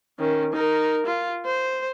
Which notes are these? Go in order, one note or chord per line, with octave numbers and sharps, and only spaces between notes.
D#3 C#4
D#4 A#4
F4
C5